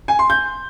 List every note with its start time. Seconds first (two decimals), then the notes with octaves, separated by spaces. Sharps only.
0.08 G#5
0.19 C6
0.30 G6